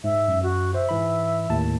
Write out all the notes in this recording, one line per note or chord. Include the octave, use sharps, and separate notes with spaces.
G#2 E5
F#2
F#4
C5 E5
G#2 E3 B5
D#2 A2 A5